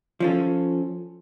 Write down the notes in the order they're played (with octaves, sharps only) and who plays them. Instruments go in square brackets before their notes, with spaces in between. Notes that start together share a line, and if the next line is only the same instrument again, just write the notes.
[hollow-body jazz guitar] F3 C#4 A4